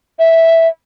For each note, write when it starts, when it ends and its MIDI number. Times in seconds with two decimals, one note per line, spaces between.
0.19 0.68 76